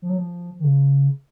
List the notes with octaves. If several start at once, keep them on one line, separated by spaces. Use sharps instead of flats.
F3
F#3
F3
D#3
C#3